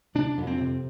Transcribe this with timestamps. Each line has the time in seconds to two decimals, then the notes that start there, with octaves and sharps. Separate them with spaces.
0.15 C3 D4
0.37 F2
0.47 C4
0.58 C3